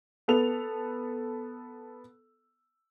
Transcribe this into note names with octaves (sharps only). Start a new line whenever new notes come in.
B3 A4 F7